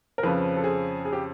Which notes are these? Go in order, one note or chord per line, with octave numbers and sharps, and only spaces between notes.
A#4
F2 C#3 F3 B4
A4
G#4
G#4
G4